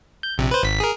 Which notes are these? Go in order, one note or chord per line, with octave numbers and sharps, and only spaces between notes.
G6
A#1 C3
B4 C5
G#1 B6
G#4 A#4